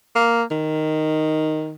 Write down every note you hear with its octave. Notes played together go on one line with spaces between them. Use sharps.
A#3
D#3